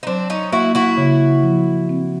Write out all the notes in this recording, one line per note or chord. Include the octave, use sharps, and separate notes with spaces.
D#4
F#3 C4 D4
C#4 D#4
A#3 E4 F#4
E4 F#4
C#3
F3
C4